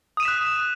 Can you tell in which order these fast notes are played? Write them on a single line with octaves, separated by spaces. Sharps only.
D#6 D#7 E7 B6 F#6